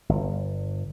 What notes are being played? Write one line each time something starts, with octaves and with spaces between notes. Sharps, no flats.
G1